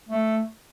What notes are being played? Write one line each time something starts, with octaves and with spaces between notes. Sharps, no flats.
A3